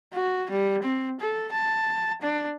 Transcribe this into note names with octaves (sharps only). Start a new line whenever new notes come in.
F#4
G3
C4
A4
A5
D4